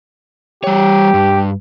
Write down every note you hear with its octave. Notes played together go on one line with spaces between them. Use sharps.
G3 G4 C#5
G2